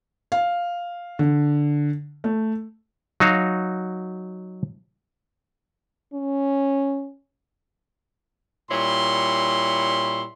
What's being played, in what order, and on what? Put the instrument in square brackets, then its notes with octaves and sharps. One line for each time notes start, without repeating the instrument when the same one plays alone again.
[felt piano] F5
D3
A3
[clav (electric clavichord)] F#3 D#4 F#4 F5
[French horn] C#4
[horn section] A#2 G3 E4 C#5 C6